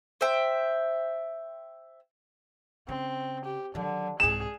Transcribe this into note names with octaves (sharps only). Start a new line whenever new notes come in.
C5 E5 G5
C#3 C4
G4
D3 D#3 F#3
C2 G#2 G#4 E7